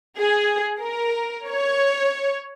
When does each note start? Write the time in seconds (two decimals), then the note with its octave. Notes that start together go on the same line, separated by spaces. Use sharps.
0.17 G#4
0.81 A#4
1.47 C#5